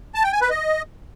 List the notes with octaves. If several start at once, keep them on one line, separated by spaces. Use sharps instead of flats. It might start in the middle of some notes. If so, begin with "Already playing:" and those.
A5
G5
G#5
B4
D#5